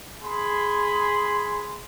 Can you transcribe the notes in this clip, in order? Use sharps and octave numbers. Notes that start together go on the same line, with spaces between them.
G#4 B5 C6